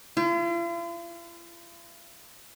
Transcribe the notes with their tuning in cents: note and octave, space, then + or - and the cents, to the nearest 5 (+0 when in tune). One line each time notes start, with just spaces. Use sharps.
F4 -45